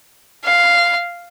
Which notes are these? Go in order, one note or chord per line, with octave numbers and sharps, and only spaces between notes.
F5